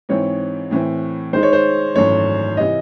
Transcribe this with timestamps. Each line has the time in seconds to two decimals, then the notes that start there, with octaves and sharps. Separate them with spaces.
0.09 G#2 E3 C4 C#5
0.71 A2 E3 C4
1.33 D#3 G#3 D#4 C5
1.43 C#5
1.53 C5
1.95 G#1 F#2 E3 A3 C#5
2.57 C3 E3 D#5